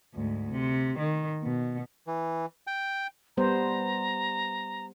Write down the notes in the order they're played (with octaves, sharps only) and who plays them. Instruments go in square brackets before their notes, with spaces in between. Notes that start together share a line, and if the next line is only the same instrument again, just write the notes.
[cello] D2 G#2
C3
D#3
B2
[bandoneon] E3
G5
[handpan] G3 B3 C5 [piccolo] A#5